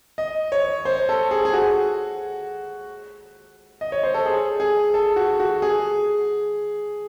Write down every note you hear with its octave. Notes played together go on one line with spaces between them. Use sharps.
D#5
C#5
C5
A4
G#4
G#4
F#4
D#5
C#5
C5
A4
G#4
G#4
A4
F#4
F#4
G#4